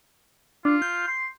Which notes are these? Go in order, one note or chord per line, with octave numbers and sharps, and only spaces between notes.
D4 F4
G6
C6